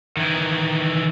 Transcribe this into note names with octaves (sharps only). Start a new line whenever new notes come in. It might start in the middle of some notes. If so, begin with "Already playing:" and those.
D#3 E3